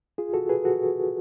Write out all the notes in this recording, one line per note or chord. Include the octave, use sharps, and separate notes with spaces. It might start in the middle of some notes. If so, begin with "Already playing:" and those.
F4 G#4
F#4 A4
G#4 B4
F#4 A4